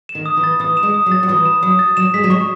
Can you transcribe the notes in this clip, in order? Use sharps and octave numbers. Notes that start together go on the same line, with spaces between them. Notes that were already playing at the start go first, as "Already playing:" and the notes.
E7
D#3
D#6
E3
A6
E3 D#6
E7
G#3
D#6
F#3
A6
F#3
E3 D#6
E7
F#3 D#6
A6
F#3 E7
G#3 B6
F#3
G#3 C#6